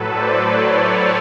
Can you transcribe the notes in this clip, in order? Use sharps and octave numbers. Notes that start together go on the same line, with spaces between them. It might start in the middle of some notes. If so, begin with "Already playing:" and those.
Already playing: A2 F#3 A4 B4
C5 D5
B4 C#5
C5 D5